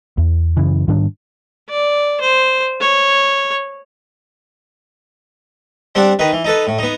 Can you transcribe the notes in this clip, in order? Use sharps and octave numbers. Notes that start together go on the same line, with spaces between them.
E2
F#2 C#3 E3
G#2 D#3 G3 D4
D5
C5
C#5
G3 C4 D4 F#5
D#3 D#4 B4
E3
D#4 A4 B4
A2
B3 D#4